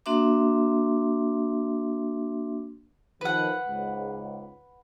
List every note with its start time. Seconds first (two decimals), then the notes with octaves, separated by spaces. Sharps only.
0.06 A#3 D4 F#4 E5 C6 D6
3.21 D#3 F3 B4 F#5
3.67 C#2 G#2